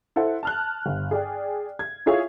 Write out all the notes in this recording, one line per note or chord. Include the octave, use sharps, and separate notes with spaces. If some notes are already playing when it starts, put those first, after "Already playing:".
E4 A4 C5 F#5
A5 F6 F#6
G1
G#4 D5 G5
G#6
E4 F4 G#4 C#5 E5 F5